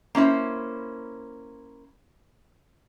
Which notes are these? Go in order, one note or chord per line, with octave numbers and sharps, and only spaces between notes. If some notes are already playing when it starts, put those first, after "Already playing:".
A#3 C#4 E4 C5